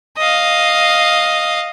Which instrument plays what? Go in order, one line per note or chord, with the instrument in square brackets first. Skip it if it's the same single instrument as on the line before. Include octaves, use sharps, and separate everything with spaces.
[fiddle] D#5 F5